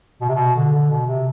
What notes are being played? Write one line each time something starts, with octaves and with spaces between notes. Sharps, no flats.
B2
C3
B2
D3
D3
B2
C3